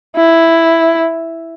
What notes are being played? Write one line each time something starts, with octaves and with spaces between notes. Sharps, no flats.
E4